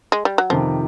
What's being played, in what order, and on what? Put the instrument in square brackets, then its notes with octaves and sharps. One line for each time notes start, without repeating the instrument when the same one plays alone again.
[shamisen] G#3
G3
F#3
[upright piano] F2 C3 D#3 [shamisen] F3